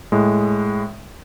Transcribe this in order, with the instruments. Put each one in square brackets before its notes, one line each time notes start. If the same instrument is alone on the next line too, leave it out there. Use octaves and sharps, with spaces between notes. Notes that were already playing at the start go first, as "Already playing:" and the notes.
[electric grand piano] A2 G#3